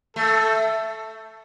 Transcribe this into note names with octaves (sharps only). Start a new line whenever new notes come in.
A3 A4